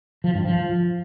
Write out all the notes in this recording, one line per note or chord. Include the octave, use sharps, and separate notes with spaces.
F3
G2
F3